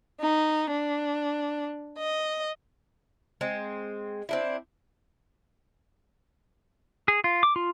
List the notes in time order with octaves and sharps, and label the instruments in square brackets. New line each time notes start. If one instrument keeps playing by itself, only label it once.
[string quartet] D#4
D4
D#5
[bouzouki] G#3 C4
C4 D4 E4
[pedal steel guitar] G#4
F4
D6
F4